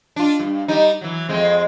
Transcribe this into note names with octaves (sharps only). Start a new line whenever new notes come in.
D4 F4
G2
G3 D#4
E3 F#3
F2 G#3 C4